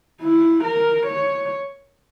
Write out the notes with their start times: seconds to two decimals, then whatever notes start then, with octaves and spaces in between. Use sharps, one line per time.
0.22 E4
0.64 A#4
1.06 C#5